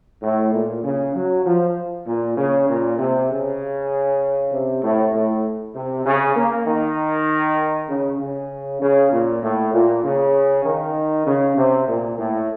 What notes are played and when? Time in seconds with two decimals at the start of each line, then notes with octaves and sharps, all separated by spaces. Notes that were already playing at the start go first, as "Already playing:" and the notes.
0.23 A2
0.54 A#2
0.84 C#3
1.15 F#3
1.46 F3
2.07 A#2
2.37 C#3
2.69 A#2
2.99 C3
3.29 C#3
4.52 C3
4.83 A2
5.14 A2
5.75 C3
6.06 C#3
6.36 A#3
6.67 D#3
7.89 C#3
8.20 C#3
8.82 C#3
9.12 A#2
9.43 A2
9.74 A#2
10.04 C#3
10.65 D#3
11.27 C#3
11.57 C3
11.88 A#2
12.19 A2